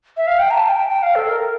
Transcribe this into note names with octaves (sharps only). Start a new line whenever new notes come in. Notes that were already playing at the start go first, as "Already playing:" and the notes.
E5
F5
G5
A#5
A5
G5
G5
F5
A4
A#4